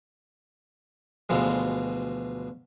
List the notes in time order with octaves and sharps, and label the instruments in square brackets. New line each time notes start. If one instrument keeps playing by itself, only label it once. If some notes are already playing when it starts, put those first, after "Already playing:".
[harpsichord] D2 B2 E3 F3 G#3